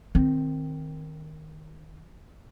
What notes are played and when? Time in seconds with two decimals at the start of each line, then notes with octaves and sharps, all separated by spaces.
0.15 D#3 C4